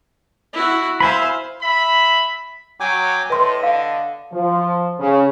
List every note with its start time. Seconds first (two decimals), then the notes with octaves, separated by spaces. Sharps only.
0.53 E4 F#4
1.00 C5 E5 F5 G#5 B5
1.61 E5 B5
2.80 F#3 G5 G#5 D6
3.30 A2 B4 D#5 C6
3.63 D3 F5
4.33 F3
4.99 C#3